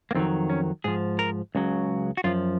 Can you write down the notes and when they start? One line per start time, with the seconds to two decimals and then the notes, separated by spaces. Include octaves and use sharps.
0.11 A#3
0.15 F2 D#3 F#3 C4
0.50 C#4
0.84 G#2 F3 G#4
1.19 A#4
1.55 C#2 C#3 F#3
2.17 F#4
2.24 F#2 F3 F4